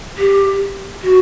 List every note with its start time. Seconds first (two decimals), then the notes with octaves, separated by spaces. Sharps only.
0.18 G4
1.03 F#4